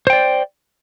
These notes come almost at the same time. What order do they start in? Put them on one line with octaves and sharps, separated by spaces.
C5 G5 D5